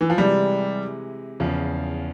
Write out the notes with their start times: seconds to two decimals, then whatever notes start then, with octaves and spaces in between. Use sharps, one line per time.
0.01 E3
0.10 F3
0.18 C3 E3 G3 G#3
1.40 E2 C#3 F3